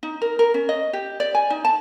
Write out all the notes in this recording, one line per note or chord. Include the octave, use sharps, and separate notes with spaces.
D#4
A#4
A#4
C#4
D#5
G4
D5
G#5
D#4
A5